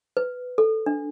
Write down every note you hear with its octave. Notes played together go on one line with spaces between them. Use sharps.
B4
A4
D4